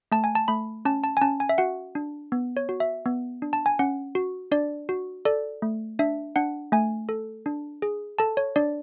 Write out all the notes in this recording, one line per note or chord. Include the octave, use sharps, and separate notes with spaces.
A3 A5
G#5
A5
A3 B5
C#4 A5
A5
G#5
C#4 A5
G#5
E5
F#4 F#5
D4
B3
C#5
F#4
E5
B3
D4
A5
G#5
C#4 F#5
F#4
D4 D5
F#4
A4 D5
A3
D4 E5
D4 F#5
A3 G#5
A4
D4
G#4
A4 A5
C#5
D4 D5